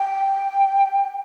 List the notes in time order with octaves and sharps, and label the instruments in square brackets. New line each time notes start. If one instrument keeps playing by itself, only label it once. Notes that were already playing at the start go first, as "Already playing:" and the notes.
Already playing: [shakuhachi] G5